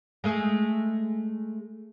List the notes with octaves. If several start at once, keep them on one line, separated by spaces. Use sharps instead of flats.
G#3 A3 G#4